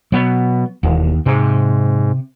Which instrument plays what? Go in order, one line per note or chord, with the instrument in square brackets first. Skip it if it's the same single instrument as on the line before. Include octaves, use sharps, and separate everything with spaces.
[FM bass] B2 [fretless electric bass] F#3 B3
[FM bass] E1 [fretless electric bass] D#2
[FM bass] G#2 [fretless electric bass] C3